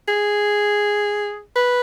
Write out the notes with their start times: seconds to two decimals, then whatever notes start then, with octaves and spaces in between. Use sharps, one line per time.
0.08 G#4
1.56 B4